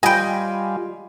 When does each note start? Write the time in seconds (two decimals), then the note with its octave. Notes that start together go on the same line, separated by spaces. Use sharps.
0.03 G3 F4 D#5 G5 G#5 B5